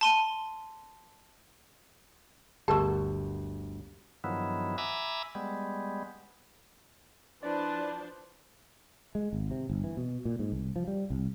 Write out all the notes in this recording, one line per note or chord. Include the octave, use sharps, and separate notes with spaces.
A5 C6 D#7
G1 D2 F#3 G4 A#4 A5 C#6
G2 D#3 F3 F#3 B3 E4
E5 G#5 A#5 B5 D6 E6
G3 G#3 B3
F3 D4 E4 B4 C5 D5 A5
G#3
G#1
C3
G1
E3
B2
A#2
G#2
C2
F3
G3
C2